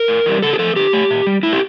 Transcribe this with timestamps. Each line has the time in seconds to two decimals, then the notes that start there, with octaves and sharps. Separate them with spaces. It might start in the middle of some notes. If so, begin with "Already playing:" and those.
Already playing: A#4
0.08 A2
0.26 E3 G3
0.42 C#3 A4
0.53 G4
0.59 F3 A3 A4
0.76 D3 G4
0.93 A3
1.10 A#2
1.27 G3
1.43 A2 E4
1.53 G4